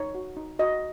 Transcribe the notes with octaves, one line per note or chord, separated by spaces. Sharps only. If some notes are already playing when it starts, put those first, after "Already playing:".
Already playing: D#4 C#5
F#4
D#4
F#4 D#5